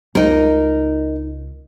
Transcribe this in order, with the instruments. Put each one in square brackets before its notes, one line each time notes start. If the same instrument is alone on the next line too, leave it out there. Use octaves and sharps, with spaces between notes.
[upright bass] C#2 [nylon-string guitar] D#4 A#4